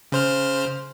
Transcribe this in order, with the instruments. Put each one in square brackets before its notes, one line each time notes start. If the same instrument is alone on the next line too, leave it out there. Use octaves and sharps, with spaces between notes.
[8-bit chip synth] C#3 C5 F6